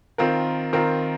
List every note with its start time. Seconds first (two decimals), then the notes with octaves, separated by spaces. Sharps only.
0.18 D#3 C4 F4 A#4
0.73 D#3 C4 F4 A#4